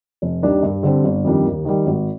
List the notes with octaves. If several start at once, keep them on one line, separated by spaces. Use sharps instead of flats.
F1
D#2 D#3 G3 D4
G2
D3 G3 C4
G1
F2 D#3 G3 D4
D#2
D#3 G3
G#1